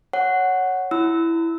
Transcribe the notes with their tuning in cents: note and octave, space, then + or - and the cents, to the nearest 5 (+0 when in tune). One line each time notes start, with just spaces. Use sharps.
C#5 +0 F#5 +0
E4 +5 B5 +35 E6 -20